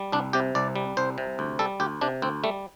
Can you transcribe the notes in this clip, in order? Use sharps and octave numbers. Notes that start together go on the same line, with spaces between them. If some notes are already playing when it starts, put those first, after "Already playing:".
Already playing: G3
C2 D4
C3 G4
C2 D5
G3
C2 C5
C3
D2
G3 A4
D2 G4
C3 D4
D2 C4
G3 A3